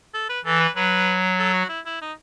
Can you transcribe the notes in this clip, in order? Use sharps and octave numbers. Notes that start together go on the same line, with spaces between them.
A4
B4
E3 A4
B4
F#3 B4
A4
F#4
E4
E4
D#4